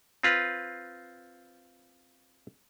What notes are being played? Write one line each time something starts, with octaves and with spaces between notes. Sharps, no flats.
C4 F4 B4